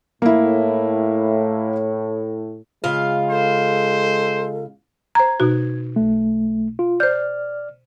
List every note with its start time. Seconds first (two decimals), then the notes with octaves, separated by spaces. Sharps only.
0.22 A2 A#3 E4
2.84 C#3 G#3 F4 F5
3.30 A4 C5
5.15 C5 A#5 G#6
5.40 B2 D#4 F#4
5.96 B1 A3
6.79 F4
7.00 C5 D5 F6 G6